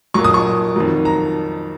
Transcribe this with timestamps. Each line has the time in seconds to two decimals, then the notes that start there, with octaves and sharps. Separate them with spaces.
0.14 A#2 F#3 C#6
0.24 D#6
0.34 C#6
0.76 F2 D#3 F#3
1.05 A#5